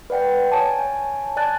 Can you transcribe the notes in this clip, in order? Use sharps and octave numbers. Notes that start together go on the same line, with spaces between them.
B4 D5 F#5 G5
C#5 G#5 A5
D5 G#5 A5 F#6 A6